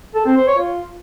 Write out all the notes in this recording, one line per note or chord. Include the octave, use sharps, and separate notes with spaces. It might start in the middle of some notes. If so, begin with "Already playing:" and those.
A4
C4
C5
C#5
F4